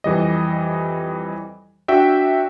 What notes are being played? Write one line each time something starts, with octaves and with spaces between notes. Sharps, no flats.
F2 E3 G3 D#5
D4 F#4 E5 G5